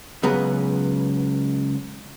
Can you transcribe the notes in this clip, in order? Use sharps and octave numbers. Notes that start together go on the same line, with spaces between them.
C#2 F#3 B3 G#4 B4 A#5